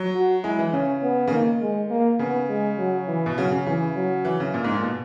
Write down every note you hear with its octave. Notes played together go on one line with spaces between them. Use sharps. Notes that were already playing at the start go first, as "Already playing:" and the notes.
Already playing: F#3
F#4
G#3 E4
E3
C#3 C#4
B3
C#3
D#3 A#3
G#3
A#3
C#3 B3
G#3
F#3
E3
B2
C#3 F#3
C#3
C#3 E3
F#3
E3
C#3
A#2
G#2
A#2
B2